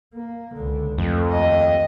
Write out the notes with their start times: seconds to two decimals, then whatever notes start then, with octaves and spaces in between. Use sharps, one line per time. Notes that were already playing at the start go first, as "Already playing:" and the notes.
0.14 A#3
0.54 C#2 D3
0.98 F2 A3
1.31 D#2 D#5